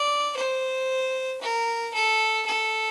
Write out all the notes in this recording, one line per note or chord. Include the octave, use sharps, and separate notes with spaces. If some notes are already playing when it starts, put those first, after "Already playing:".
Already playing: D5
C5
A#4
A4
A4